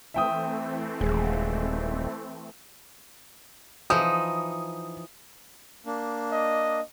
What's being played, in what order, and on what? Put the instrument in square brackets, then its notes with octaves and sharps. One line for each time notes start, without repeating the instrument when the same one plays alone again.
[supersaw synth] E3 A3 C4 [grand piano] E5 G5 D#6
[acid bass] D#1 [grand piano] G#3
[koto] E3 F3 D#4 [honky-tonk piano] D#6
[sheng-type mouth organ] A#3 D4
[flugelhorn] D#5